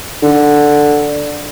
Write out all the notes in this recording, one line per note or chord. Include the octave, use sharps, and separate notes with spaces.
D3